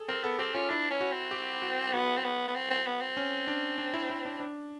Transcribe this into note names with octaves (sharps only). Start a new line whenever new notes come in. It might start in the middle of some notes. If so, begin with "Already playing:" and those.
Already playing: G#4 A4
C4 A#4
B3 A4
C4 G4
C#4 F4
D4 E4
C#4
F#4
C4
G4
F#4
B3 F#4
C4
B3
B3
C4
C4
B3
C4
C#4
D4
D4
E4
E4
D4
D4